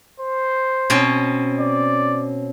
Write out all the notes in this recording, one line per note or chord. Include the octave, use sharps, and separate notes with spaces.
C5
B2 C4 C#4
D5